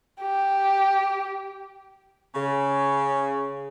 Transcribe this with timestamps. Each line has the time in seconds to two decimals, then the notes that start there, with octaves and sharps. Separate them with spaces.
0.22 G4
2.35 C#3